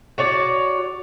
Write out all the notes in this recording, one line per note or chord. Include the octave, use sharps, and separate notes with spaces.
F#4 C#5 D5